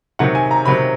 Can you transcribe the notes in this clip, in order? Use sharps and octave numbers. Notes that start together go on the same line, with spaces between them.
C3 D#3 F#3 F#5
G#5
A#5
C3 D#3 F#3 B5